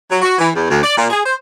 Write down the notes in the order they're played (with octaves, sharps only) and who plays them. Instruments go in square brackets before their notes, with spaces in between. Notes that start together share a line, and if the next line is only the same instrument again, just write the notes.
[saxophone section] F#3
F#4
E3
E2
D2
D5
A#2
G#4
C5